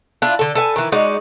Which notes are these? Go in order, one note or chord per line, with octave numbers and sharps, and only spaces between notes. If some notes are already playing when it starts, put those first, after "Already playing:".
D4 E4 F4
D3 A4
A4 B4 G#5
D#3 E3
G#3 D#4 F#4 D5